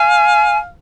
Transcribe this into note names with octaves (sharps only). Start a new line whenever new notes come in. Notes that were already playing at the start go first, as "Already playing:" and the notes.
Already playing: F5 G#5